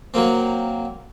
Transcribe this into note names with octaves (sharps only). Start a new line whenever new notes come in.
F#3 A#3 C4